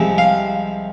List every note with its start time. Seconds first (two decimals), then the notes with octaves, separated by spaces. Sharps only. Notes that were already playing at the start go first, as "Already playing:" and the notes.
Already playing: C2 C3 F3 G#3 C4
0.18 F5